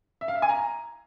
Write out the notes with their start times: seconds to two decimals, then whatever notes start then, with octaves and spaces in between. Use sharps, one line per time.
0.21 E5
0.28 F5
0.35 E5
0.42 G#5
0.49 A#5